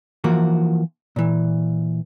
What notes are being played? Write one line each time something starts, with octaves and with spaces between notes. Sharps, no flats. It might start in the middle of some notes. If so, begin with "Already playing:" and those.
E3 F3 A#3 F4 F#4
A#2 E3